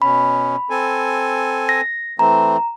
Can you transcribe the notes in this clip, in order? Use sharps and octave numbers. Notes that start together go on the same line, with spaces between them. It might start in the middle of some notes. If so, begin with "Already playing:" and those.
B2 C#4 B5
C4 A4 G#5
A#6
E3 A3 C4 A#5